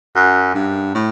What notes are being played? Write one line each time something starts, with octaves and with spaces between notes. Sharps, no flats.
F#2
G2
A2